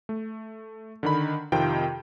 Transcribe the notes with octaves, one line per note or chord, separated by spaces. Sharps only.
A3
D3 D#3 B5
F2 C3 D#3 F4 G5